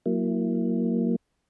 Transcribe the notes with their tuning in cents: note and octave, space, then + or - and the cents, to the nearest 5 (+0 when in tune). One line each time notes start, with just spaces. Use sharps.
F#3 +0 A#3 +0 E4 +10